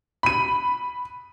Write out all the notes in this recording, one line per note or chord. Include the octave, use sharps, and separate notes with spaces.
B5 D#7